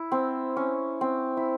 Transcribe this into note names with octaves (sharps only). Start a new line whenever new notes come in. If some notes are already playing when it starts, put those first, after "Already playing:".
Already playing: E4
C4
C#4
C4
E4